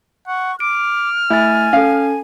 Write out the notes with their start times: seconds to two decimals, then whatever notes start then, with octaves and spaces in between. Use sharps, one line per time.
0.28 F#5 C#6
0.60 D6 F6 D7
1.30 A3 E4 G#5 A6
1.73 C#4 A4 F5